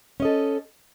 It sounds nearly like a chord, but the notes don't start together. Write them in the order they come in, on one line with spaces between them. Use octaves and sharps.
C#4 D#5 A4